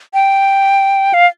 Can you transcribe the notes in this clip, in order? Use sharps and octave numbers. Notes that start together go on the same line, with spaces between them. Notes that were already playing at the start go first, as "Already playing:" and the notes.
G5
F5